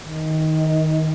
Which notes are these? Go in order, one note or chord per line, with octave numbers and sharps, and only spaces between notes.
D#3